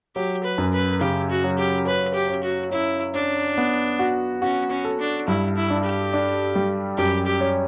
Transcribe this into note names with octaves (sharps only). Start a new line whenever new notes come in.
F#3 G4
B4
F#2
B4
C#3 G4
F#4
F#3
G4
C#4 B4
G4
C#4
F#4
C#4 E4
C#4 D4
B3
F#4
C#4 F#4
C#4
A4
D4
G2 E4
E4
D4
G4
D4
G3
F#2 G4
G4
C#4